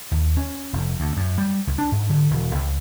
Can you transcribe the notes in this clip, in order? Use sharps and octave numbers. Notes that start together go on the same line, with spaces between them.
D#2
C#4
F1
D2
F#2
G3
C#2
D4
G#2
D3
E1
C#2